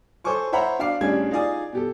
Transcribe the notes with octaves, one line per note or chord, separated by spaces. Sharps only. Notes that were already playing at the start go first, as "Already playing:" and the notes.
A4 C5 C#5 G#5 C#6 D6
C5 C#5 E5 F#5 A#5 B5
D4 F#4 F5 D6 C7
A1 G3 C#4 D4 G#4 G#6
D#4 F4 G#4 D5 G#5 D#6
B2 G4 A4